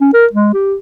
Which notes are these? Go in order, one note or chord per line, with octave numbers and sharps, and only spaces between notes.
C#4
A#4
G#3
G4